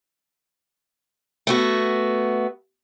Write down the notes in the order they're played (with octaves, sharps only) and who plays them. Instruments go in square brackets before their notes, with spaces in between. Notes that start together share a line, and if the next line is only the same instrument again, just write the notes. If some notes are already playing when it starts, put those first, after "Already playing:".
[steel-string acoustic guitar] A3 B3 F#4